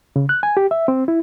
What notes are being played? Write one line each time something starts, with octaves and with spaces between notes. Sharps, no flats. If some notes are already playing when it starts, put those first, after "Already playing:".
C#3
F#6
G#5
G4
E5
C4
E4